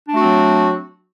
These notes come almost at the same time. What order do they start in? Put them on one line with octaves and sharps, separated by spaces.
D4 A3 F#4 C4 F#3